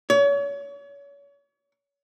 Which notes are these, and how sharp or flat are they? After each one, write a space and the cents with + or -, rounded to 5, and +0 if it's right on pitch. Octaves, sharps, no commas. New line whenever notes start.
C#5 +35